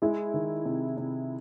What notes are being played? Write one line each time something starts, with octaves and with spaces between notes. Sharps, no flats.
G#3 E4
D#3
C3
C3